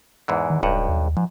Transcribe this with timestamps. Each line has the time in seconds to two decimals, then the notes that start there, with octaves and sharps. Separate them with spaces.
0.28 E2 G#2 E3
0.50 D#3
0.63 D1 B1 G2 F#5
0.89 D#2
1.17 G#2 F3